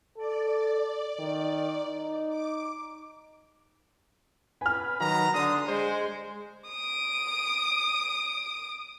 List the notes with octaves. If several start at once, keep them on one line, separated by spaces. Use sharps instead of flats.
A4 D5
D#3
D#4
D6
B4 G#5 F6
D#3 F#3 B4 A#5
D3 C6 D#6
G#3 C5
D#6 D7